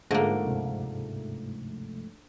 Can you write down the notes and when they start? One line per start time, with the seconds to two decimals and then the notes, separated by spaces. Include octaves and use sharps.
0.11 G#2 D3 F3 A3 A#3 G#4
0.43 D2 G2 C3